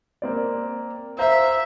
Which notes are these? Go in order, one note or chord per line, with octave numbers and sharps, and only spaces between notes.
A#3 C4 D5
C5 E5 F5 A#5